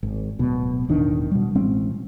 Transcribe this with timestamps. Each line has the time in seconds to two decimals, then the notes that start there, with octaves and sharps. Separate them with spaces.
0.03 G#1
0.39 D1 B2
0.88 E1 A1 D#3 D4
1.31 B2 G3
1.55 A1 G#3 C4 C#4